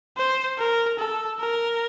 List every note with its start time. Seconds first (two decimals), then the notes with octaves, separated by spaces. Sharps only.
0.17 C5
0.58 A#4
0.99 A4
1.39 A#4